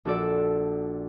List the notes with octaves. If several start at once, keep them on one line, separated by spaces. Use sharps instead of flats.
A#1 D4 F#4 A4 D5 E6